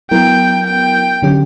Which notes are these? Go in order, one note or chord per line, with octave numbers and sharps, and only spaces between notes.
F#3 B3 E4 A#4 G5
G5
D3 F#3 C#4 G4